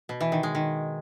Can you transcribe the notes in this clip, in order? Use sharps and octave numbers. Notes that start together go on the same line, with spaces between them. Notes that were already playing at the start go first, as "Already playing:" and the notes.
B2
E3
D#3
G#3
D#3